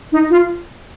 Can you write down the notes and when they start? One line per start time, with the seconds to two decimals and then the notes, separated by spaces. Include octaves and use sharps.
0.11 D#4
0.29 F4